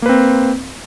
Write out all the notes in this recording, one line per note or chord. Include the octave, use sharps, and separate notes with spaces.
A#3 C4 B4